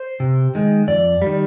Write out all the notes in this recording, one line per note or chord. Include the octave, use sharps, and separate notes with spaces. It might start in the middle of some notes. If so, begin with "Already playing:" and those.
Already playing: C5
C3
D#3 G#3
F2 D5
D#3 G3